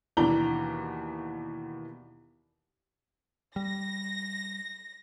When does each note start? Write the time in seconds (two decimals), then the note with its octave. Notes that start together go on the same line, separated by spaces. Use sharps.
0.17 D#2 B2 E3 D4 A#5 G7
3.56 G3 A#6